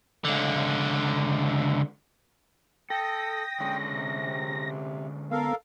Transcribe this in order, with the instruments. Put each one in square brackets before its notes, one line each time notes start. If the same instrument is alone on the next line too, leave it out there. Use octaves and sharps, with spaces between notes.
[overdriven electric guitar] C#2 D3
[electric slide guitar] A4 [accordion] G5 D#6 [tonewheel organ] A#6
[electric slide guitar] D3 G#3 C#4
[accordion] C3
[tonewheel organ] B3 [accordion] A4 A#4 F5